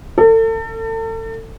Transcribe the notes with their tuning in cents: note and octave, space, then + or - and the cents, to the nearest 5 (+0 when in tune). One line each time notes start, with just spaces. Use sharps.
A4 +35